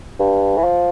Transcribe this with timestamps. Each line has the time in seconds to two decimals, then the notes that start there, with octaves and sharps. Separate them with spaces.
0.19 G2
0.57 E3
0.64 F3